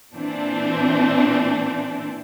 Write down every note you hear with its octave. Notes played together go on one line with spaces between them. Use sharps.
A#2 E3 C4 D4